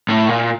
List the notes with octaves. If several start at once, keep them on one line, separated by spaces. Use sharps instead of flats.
A2
A#2